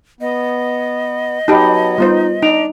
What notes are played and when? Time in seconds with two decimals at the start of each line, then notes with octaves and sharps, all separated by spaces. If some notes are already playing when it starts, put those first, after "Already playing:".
0.21 B3 D#5
1.48 F#3 B3 D#4 G4 A5 B5
1.98 G3 B3 D#4 F4 C5
2.42 D4 D#4 D7 F7